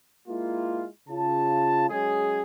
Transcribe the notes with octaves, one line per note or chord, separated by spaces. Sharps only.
G#3 A#3 E4 F4
C#3 F4 A5
F#3 G#3 C#4 G#4